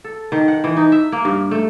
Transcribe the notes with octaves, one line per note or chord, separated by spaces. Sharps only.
A4
D#3
F#5
E3
D#4
E5
A#3
G2
A3